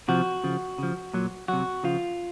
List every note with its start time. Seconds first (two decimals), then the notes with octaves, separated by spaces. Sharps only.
0.08 C3 F3 F#4
0.44 C#3 F3
0.78 C#3 F3
1.14 A#2 F#3
1.48 C3 F#3 F#4
1.83 C#3 F3 F4